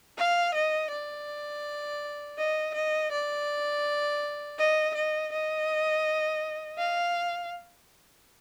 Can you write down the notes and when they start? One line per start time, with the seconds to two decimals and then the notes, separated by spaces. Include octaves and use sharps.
0.17 F5
0.55 D#5
0.91 D5
2.38 D#5
2.75 D#5
3.12 D5
4.59 D#5
4.94 D#5
5.32 D#5
6.78 F5